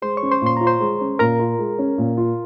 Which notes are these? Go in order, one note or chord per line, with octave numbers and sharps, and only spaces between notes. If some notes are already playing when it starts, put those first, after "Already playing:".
G#3 C5 C6
C#5 C#6
C#4
C5 C6
A#2 C6
F4 A#5
C5 C6
G#3
C#4
A#2 A#4 A#5
F4
G#3
C#4
A#2
F4